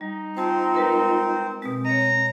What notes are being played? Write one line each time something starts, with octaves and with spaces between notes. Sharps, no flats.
G3 D#4
C4 F4 C5 G5 A5
G#3 A#4 B4
B2 G#3 C4
C#5 D#5 A#5